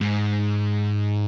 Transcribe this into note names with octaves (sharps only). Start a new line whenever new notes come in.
G#2